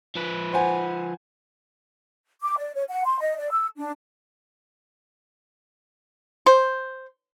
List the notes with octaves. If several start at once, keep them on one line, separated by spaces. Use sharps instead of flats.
F3 B4
C5 F#5 G#5
D6
D5
C#5
F#5
C6
D#5
D5
E6
D4
C5